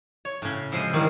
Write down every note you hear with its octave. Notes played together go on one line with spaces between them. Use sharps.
C#5
A2 C#3
C3 F3 G#3 E6 C7 D#7
D#3 E3 G3